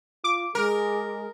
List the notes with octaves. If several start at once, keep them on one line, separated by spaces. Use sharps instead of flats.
F4 D6
G#3 G#4 A#4